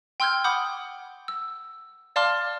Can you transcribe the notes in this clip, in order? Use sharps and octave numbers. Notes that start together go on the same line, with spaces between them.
G5 C6 E6 F6 G6 G#6
F#5 B5 D6 D#6 G6
E6
D5 F5 A5 C6 D6 F6